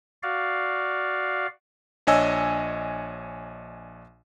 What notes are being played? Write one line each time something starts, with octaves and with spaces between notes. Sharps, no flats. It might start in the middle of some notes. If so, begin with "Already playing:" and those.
F#4 D5 F5
A#1 D4 C#5 D#5 G#5 E6